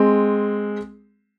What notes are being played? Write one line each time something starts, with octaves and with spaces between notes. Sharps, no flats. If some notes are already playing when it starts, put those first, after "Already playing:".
Already playing: G#3 C4